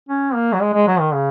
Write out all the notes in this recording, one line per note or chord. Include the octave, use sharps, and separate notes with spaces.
C#4
A#3
F#3
G#3
G#3
F#3
D#3
C#3